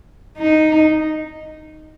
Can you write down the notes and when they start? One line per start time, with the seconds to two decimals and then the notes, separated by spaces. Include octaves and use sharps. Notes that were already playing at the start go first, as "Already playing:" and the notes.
0.38 D#4